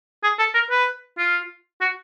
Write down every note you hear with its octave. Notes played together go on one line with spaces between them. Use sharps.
G#4
A4
A#4
B4
F4
F#4